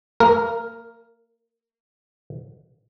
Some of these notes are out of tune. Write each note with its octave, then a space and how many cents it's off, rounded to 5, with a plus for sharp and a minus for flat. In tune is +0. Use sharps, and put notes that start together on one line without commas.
A#3 -35 A#4 +0